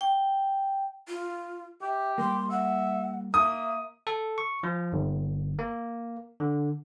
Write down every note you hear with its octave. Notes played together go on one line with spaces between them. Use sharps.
G5
F4
G4 E5
G3 A#3 C6
E5 F#5
A#3 E5 D#6
A4
C#6
F3
G1
A#3
D3